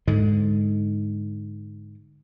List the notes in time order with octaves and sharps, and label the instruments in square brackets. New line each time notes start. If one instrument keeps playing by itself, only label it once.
[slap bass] G#2 D3 G#3